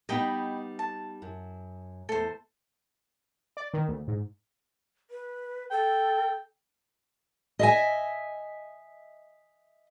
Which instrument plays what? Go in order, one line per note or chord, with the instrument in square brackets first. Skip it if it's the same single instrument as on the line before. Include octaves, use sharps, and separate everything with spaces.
[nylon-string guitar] G3 B3 D#4 [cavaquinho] D#5 G5 B5
[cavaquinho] A5
[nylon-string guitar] F#2
[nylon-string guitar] E2 A3 [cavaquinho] A4 C5
[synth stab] D5
D#3
D2
G#2
[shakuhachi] B4
[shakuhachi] A4 [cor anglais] G5
[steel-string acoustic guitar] D#5 E5 G#5